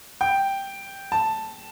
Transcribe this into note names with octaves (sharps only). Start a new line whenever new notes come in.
G5
A5